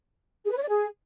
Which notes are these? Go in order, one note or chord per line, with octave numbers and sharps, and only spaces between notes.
G#4
B4
C#5
D5
G#4